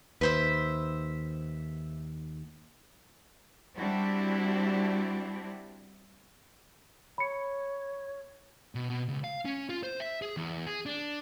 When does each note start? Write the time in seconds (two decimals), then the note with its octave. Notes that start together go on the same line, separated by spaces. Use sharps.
0.21 D#2 B4 C5 E5
3.76 G3 C4 D4 E4 F#4 G4
7.18 C#5 B5 C#7
8.75 B2
8.90 B2
9.09 C#2
9.24 F5
9.45 C#4
9.70 F4
9.83 C5
10.00 E5
10.22 G#4
10.37 E2
10.66 G#4
10.86 D4